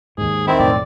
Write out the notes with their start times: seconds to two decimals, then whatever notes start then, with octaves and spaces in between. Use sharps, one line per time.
0.18 D#2 G#2 G#4
0.47 D#3 C4 E4
0.59 B1 F2 A2 D5